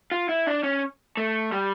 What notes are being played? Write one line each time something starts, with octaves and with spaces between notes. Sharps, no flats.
F4
E4
D4
C#4
A3
G3